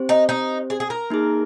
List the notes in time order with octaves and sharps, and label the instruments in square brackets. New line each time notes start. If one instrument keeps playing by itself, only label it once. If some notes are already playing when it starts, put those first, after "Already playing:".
Already playing: [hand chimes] C4 G4 C5
[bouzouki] D#4
D#4
G#4
G#4
A#4
[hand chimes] A#3 D#4 G#4